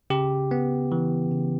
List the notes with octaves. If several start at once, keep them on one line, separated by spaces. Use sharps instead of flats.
C#3 G4
B3
E3
C#3